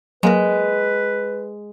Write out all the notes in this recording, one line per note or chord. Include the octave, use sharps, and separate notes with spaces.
F#3 G#3 A#3 A#4 B4